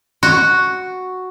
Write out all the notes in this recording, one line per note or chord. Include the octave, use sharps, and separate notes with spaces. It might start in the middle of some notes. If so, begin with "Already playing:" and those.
F#4